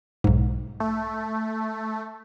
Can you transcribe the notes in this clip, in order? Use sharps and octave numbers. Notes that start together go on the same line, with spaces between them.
B1 G#2
A3